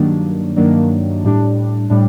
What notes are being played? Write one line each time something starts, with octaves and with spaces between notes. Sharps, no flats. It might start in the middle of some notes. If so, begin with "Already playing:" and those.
Already playing: G2 D#3 F#3 A#3 D4
G2 D#3 F#3 A#3 D4
A2 G3 D4
A2 G3 D4